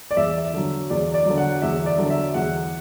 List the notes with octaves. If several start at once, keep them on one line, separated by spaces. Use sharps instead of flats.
D5
E2 E5
D3 F#3
E2 D5
D5
D3 F#3
F#5
E2 E5
D5
D3 F#3
E5
E2 F#5